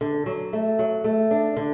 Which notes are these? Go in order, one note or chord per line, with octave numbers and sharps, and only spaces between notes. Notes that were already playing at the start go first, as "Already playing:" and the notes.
D3
F#3
A3
F#3
A3
D4
D3